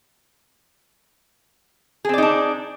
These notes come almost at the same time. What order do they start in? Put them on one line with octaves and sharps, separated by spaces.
G#4 C4 D5 D#4 D4